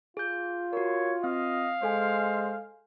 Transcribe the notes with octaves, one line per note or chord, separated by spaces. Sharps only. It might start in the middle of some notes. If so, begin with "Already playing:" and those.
F4 G#4 G6
F#4 A#4 C#5
C4 D#5 F5
G#3 A4 C5 G#5